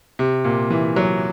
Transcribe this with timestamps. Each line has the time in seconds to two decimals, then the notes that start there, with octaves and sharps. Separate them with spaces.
0.19 C3
0.45 A#2
0.70 E3
0.96 F#3